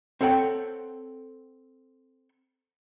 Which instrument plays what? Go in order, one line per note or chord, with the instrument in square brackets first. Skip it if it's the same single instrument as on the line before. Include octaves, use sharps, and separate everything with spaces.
[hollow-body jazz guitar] C4 A4 C#5 F#5 G5